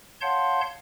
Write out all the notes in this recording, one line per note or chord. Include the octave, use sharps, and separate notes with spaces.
C#5 F5 F#5 A5 C6 G6